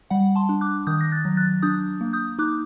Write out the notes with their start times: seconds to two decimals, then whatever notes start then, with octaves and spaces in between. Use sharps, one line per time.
0.10 G3 F#5
0.35 A5 C6
0.49 D4
0.61 D6 F#6
0.87 D#3 D#6 G6
1.01 A#6
1.12 F#6 A6
1.25 F#3
1.37 F#6 A6
1.62 D4 D#6 G6
2.01 A#3
2.13 D#6 G6
2.39 D#4 D6 F#6